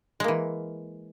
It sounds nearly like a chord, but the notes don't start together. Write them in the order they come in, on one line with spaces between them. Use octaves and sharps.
G#3 A#3 E3